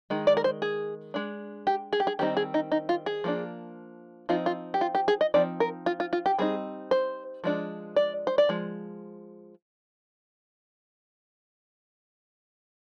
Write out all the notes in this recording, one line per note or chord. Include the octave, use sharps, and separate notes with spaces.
D#3 G#3
D5
A#4
C5
G#4
G#3 D4
G4
G#4
G4
G#4
D#3 G3 C4 D#4 G4
G#4
D#4
D#4
F4
G#4
F3 A#3 D4
F3 C4 D#4 F4
F4
G4
F4
G4
G#4
D#5
F3 C4 D#4 D5
A#4
F4
F4
F4
G4
G3 C4 D#4 G#4
C5
F3 G#3 D4
D5
C5
D5
F3 G#3